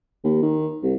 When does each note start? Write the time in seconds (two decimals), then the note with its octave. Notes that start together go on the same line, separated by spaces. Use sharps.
0.24 D#2
0.43 D#3
0.82 C2